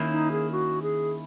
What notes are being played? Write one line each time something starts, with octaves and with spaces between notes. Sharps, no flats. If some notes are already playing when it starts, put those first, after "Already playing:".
Already playing: D#2 D#3 A#3 C#4 E4
D#4
G#4
F#4
G#4